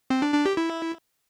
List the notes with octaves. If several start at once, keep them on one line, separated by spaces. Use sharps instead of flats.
C4
D4
D4
G4
E4